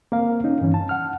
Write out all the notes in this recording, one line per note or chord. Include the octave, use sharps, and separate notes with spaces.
A#3 C4 A#4 F5
C#4 D#4
G2 E3 C#4
A5
F#5 F6